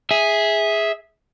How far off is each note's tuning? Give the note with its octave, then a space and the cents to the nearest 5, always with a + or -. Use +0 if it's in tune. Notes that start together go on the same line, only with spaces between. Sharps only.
G#4 +0 E5 -10